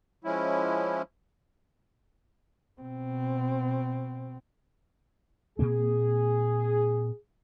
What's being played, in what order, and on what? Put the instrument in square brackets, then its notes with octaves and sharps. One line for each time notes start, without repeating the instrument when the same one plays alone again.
[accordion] F3 G#3 C#4 E4
[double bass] B2 C4
[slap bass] A#2 A#3 C4 [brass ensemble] G#4